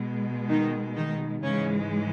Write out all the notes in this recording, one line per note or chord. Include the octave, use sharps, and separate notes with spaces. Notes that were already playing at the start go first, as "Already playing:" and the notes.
Already playing: B2 G#3
D#3 D#4
D#3 D#4
G#2 C#3 E3 G#3 C#4